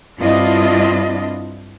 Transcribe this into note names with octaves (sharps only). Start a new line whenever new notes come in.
G2 C4 D4 E4 F4 D#5